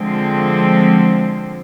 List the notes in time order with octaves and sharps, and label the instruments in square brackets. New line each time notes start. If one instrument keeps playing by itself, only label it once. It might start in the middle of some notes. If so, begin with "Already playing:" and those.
Already playing: [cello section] D3 F3 G#3 C4